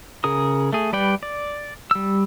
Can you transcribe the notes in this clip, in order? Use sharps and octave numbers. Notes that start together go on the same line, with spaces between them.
C#3 G#4 A#4 D#6
A3 G#4
G3 B4 D5 G5
D5
G3 E6